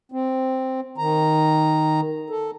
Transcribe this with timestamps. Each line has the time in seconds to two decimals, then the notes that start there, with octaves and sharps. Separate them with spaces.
0.12 C4
0.98 D#3 A#5
2.30 A4